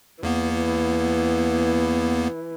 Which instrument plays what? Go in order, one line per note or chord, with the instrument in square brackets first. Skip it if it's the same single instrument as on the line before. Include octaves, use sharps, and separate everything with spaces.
[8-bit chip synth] E2 A#3 B3 [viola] E3